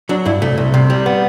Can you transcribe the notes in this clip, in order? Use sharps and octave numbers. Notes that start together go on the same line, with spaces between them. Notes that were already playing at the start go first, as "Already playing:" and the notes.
F#3 D4
G2 E4
C2 A3
C2
C3
G3
B3